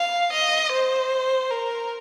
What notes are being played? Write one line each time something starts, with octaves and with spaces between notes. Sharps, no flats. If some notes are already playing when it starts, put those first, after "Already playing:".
Already playing: F5
D#5
C5
A#4